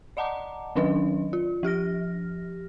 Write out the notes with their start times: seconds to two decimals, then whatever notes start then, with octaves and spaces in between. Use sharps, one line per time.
0.17 D5 D#5 F#5 A5 A#5 D6
0.76 D#3 F#3 C#4 D4 B4 D#5
1.33 F4
1.63 F3 G4 F6 A#6